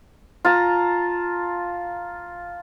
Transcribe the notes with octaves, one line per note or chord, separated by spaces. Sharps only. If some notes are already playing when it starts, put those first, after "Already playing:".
F4 A5 A#5